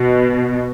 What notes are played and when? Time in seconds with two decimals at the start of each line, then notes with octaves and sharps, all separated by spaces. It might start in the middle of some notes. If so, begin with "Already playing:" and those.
Already playing: B2